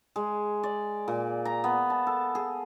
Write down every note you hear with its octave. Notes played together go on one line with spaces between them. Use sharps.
G#3
D5
A#2
A#5
B3
A5
A4
G#4